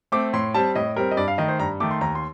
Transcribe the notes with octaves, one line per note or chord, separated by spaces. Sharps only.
A3 C4 D6
A2 C6
G3 C4 A5
A2 D#5
G3 C4 A#4
D#5
G2 D5
F5
D#3 A3 D#5
C5
G2 A#5
D#3 A3 D6
C6
D#2 A#5
C6